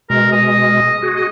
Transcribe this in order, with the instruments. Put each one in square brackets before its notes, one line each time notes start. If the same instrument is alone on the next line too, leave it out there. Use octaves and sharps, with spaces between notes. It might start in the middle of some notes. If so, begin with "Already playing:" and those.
[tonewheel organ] B2 G#3 [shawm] A#4
[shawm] D#5
[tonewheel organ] F#4 G#4
[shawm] D#5